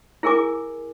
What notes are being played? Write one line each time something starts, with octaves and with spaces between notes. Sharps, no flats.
E4 G#4 A#4 G#5 D6